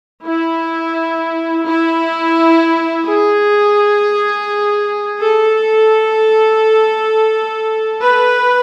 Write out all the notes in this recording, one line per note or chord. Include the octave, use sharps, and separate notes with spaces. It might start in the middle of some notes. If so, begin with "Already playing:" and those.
E4
E4
G#4
A4
B4